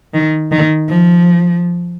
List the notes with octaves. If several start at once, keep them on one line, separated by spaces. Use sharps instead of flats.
D#3
D#3
F3